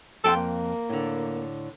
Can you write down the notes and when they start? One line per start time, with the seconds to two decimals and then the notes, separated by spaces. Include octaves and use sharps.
0.24 F2 A4 G5 C6
0.36 A#3
0.89 A2 D3